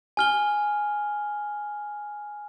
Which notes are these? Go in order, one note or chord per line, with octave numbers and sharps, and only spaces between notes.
G#5 F6 G7